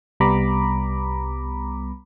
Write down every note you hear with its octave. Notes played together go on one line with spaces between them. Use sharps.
C2 G3 B3 A#5 B5 D6